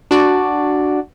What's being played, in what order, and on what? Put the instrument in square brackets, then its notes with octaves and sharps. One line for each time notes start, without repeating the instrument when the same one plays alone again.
[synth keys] D4 F#4 D5